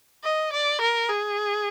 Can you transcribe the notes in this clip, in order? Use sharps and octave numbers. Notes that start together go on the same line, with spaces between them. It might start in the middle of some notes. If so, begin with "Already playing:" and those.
D#5
D5
A#4
G#4